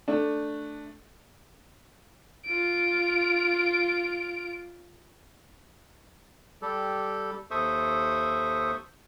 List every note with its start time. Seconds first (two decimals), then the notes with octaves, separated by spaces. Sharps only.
0.08 A3 D4
2.46 F4 D7
6.62 G3 G4 A4
7.51 D#2 A4 C5 E5 C#6 D#6